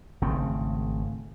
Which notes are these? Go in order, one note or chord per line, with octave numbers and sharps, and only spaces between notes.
G#1 C#3 A3 C4